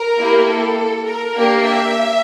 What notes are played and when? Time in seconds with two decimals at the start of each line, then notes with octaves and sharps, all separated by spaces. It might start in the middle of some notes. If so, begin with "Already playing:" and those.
Already playing: A#4
0.17 A#3 E4 G4
0.46 A4
1.06 A#4
1.34 A#3 D4 G4
1.64 E5